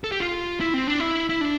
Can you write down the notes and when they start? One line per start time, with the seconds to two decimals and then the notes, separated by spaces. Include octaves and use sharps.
0.04 A4
0.12 G4
0.20 F4
0.60 E4
0.74 C4
0.87 D4
1.00 E4
1.29 E4
1.41 D4